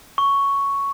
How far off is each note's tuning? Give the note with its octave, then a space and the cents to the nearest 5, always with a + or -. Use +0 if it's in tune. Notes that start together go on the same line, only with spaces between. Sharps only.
C#6 +5